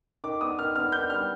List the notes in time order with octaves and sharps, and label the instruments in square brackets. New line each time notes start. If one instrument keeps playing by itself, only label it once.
[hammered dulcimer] D#3 [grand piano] D6
[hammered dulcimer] B3 D4 [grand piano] D#6
[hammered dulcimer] D#3 [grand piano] F6
[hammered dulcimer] B3 D4 [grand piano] F6
[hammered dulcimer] D#3 [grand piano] G6
[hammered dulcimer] G3 D4 [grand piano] F6